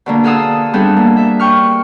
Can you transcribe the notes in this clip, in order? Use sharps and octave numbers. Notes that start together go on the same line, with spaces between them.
B2 D3 A#3
G#4 A4 F5 F#5 D#6 E6
G3 B3 C4 D4 G#4 A4
A#3
E5
G5 C#6 F6